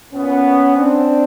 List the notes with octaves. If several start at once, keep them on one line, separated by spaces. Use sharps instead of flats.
A#2 B3 C#4
C4 D4